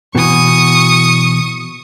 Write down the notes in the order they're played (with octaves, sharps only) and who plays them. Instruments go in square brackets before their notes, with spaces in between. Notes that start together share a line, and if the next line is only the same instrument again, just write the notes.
[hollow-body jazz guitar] B2 E3 [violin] C#6 D#6